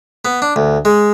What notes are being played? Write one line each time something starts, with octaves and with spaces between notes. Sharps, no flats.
B3
D4
D2
G#3